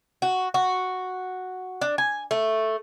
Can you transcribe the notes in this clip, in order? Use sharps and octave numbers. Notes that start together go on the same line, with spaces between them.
F#4
F#4
D4
G#5
A3